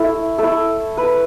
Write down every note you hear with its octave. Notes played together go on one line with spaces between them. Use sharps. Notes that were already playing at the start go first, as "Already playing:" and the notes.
Already playing: A3 E4
A3 E4 A4
B4